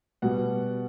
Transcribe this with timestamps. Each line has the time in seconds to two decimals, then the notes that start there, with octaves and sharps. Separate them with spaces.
0.22 B2 G3 F#5